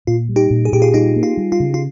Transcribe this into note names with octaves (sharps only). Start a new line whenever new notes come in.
A#2 F4
G3
D#4 G4
A#2
G#4
A#2 G4
F4 G#4
G3 D#4 G4
A#3
F4
G3
F4
C#3
F4